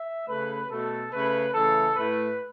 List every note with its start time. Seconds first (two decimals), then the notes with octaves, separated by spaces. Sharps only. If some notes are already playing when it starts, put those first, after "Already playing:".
Already playing: E5
0.28 C#3 A3 B4
0.70 B2 A3 A4
1.12 C#3 A3 B4
1.53 C#3 E3 A3 A4
1.96 A2 A3 B4